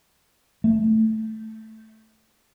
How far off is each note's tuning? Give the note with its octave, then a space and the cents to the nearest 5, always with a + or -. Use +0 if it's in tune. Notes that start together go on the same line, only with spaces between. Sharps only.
A3 +0